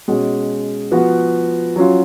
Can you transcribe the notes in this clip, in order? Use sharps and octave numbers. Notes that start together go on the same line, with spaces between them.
B2 G#3 C#4
F3 B3 F#4
F#3 C#4 F4